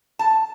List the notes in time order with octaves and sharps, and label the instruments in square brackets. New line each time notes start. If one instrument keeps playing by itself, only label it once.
[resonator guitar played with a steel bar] A5